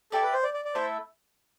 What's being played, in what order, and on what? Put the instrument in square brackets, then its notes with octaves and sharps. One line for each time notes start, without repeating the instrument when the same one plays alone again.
[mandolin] E4 G4 D5 [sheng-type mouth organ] A4
[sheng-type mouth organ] B4
C5
D5
D5
D5
[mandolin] A3 E4 A4 E5 [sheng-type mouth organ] C5